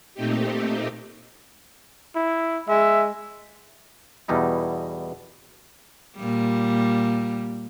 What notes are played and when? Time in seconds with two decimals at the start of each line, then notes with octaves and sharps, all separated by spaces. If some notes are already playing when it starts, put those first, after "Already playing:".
0.14 A#2 A3 C4 D#4 G4
2.15 E4
2.68 G#3 E5
4.28 E2 B2 G3 D#4 E4
6.17 A#2 G3